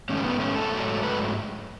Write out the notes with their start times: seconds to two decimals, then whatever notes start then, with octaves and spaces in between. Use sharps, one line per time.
0.09 G#2 D#3 A3 C#4
0.24 B3
0.40 C#4
0.56 A4
0.72 G#2 F#3 A3
1.03 B4